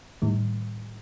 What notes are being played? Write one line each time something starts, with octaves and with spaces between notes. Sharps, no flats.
A2 D#3 G3